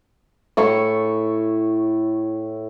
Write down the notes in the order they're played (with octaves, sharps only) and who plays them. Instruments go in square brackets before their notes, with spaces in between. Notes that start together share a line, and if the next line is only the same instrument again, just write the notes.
[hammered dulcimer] A2 E4 C#6